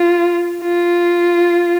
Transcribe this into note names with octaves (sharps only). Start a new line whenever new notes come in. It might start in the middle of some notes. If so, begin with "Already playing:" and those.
Already playing: F4
F4